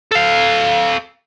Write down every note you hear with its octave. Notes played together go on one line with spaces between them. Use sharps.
A4 F5